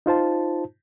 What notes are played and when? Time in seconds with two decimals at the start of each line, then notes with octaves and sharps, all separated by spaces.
0.06 D#4 F4 C5 A5